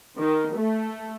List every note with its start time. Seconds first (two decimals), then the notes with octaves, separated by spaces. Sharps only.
0.19 D#3
0.56 A3